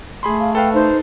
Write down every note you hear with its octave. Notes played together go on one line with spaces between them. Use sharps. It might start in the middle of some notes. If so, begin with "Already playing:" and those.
A3 G#4 B5 C6
F5
A4 B4 F5 G5
D#4 C5